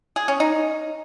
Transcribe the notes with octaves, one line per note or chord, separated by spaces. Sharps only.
G#4
C#4
D#4